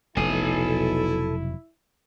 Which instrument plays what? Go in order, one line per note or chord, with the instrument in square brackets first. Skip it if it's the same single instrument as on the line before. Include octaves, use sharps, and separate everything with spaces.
[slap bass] F1 B2 F#3 [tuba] B1 [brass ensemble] E4 [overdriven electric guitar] A4 G#5